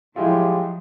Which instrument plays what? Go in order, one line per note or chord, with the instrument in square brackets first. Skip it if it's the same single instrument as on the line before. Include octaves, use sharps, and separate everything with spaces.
[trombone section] A2 G4 [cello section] F3 F#3 [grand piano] G#3 E4 F4